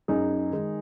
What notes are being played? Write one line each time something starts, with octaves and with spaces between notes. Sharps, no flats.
F#2 D#4 G#4
D#3 G#3